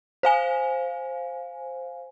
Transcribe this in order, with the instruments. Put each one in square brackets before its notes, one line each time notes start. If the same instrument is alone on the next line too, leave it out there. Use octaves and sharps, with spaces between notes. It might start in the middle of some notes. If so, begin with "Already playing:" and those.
[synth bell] C5 F5 G#5